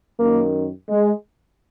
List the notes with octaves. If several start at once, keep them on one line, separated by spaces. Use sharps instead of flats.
F#2 D#3 A#3
G#3